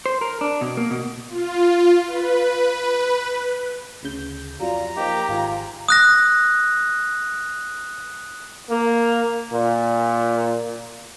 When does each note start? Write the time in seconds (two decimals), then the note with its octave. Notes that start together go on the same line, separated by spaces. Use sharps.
0.06 C5
0.21 A#4
0.41 D4
0.61 B2
0.77 A#3
0.91 B2
1.29 F4
2.08 B4
4.03 D2 C#3 G6
4.60 F2 F#3 G3 F4 A#5
4.97 F3 A#3 D#4 G4
5.29 G#1 G#2 F4 G#5
5.89 D#6 F#6 A#6
8.70 A#3
9.51 A#2